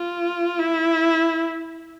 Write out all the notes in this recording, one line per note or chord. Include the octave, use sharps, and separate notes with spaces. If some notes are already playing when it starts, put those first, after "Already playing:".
Already playing: F4
E4